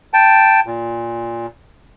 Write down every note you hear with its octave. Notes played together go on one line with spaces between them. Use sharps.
G5 A5
A#2